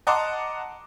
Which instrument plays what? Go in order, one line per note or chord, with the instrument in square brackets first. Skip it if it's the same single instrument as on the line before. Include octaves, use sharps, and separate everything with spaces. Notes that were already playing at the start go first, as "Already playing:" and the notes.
[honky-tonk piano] D#5 F#5 A5 A#5 C6 D6